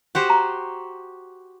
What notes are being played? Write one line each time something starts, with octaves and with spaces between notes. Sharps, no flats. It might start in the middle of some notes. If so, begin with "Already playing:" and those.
F#4 G4 C5
A#5